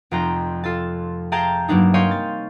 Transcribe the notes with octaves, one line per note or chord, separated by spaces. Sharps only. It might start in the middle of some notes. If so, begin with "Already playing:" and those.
F1 F2 F4 G5 A#5
F4 A4 A5
G#4 F5 G5 A5 A#5
G2 F#3 A#3 D4 D#4
C5 C#5 D#5 F5 G5 G#5
A6